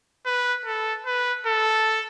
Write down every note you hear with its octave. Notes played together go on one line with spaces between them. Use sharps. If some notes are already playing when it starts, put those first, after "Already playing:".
B4
A4
B4
A4